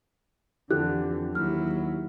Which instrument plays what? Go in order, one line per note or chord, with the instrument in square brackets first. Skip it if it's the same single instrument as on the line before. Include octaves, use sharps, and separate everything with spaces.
[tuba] F2 [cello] D3 E3 [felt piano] G4 A4 [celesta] F#6
[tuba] D#2 [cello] F#3 E4 [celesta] F6